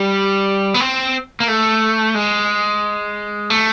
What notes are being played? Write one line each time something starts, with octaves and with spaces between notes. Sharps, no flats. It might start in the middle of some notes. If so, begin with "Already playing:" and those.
Already playing: G3
B3
C4
A#3
A3
G#3
A3